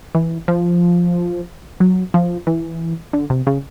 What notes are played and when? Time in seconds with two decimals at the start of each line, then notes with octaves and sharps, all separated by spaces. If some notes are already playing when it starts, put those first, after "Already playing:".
0.15 E3
0.48 F3
1.80 F#3
2.14 F3
2.47 E3
3.13 D3
3.30 C3
3.47 C#3